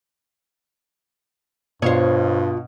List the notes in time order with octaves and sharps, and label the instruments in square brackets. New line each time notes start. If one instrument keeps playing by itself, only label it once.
[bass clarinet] G2 [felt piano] B2 F5 [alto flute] F4 [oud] C5 C#5